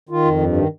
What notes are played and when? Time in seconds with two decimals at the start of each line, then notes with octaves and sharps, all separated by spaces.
0.09 D#3 F4
0.25 F2
0.41 G2
0.56 D#3